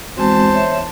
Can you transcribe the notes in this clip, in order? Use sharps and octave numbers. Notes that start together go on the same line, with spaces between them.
E2 G#3 C4 F#4 C5 A5
C#5 E5